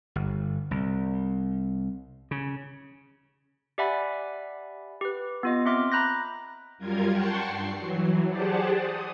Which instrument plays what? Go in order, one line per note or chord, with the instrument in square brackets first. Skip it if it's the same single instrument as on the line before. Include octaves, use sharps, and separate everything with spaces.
[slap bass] G1
C2
C#3
[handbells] G4 D5 E5 F#5 G#5 B5
G4 B4
B3 F4 D#5
C4 E5 C6 D6 F6
A#5 B5 F#6 G6 A#6
[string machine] F#2 G3 F4 A#4 G#6
F#5 G5 A5 C6 C#6
G2 C7
E3 F#3
G4 G#4 C5 D5 F#5 A5
D#6